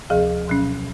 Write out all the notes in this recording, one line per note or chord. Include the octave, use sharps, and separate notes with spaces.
D2 C3 F3 G#4 F5
B2 F#3 C#4